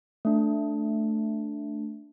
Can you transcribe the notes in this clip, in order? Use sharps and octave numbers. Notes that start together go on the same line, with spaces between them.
A3 D4